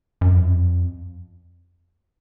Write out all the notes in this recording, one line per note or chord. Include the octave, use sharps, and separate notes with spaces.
F#2
F2